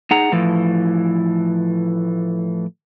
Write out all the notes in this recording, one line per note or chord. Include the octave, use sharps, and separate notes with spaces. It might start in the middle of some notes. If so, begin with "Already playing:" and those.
D#4 G#4 F#5 A#5
A2 E3 F3